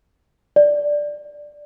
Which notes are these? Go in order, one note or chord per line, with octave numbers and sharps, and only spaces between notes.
D5